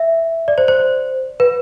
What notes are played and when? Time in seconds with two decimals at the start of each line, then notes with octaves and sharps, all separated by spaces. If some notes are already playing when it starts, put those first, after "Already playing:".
Already playing: E5
0.48 D5
0.58 C5
0.68 C5
1.40 B4